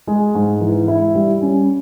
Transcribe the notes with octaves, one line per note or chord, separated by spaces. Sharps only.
G#3
G#2
E3
E4
G3
C#4